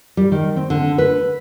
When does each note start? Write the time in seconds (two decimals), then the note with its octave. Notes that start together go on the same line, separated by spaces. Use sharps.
0.17 G3
0.32 D#3
0.56 C4
0.70 D3
0.98 B4